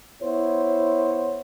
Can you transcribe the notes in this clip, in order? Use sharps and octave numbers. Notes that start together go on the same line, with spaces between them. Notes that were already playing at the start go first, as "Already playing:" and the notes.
B3 E4 C5 C#5